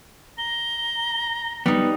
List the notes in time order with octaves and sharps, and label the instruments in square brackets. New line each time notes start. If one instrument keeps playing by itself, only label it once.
[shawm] A#5 [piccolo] G7
[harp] G3 D#4 [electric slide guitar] B3